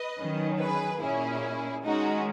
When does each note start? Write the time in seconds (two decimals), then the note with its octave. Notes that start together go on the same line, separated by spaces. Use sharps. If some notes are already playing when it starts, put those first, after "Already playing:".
Already playing: B4 D#5
0.19 D#3 F#3 C#4
0.59 G#4 B4
1.01 A#2 A#3 C#4 E4 G#4
1.83 D#3 G#3 C#4 D#4 F#4